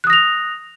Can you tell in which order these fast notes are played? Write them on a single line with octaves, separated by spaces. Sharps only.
F#6 D#6 A#6 F7